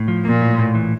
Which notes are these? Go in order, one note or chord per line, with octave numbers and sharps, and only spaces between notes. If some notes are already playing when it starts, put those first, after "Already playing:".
Already playing: A2
F3
A#2 A#3
A2
A2
E3